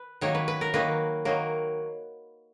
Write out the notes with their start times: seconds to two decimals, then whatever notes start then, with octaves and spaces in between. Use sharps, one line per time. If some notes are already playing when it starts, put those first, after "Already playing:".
Already playing: B4
0.21 D#3 F#3 A#3 C#5
0.35 B4
0.48 B4
0.61 A#4
0.74 D#3 F#3 A#3 B4
1.25 D#3 F#3 A#3